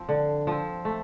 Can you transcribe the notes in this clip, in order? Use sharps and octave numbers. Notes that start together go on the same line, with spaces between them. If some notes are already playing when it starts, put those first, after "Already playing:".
Already playing: F3 C4
D3
F3 C4
A3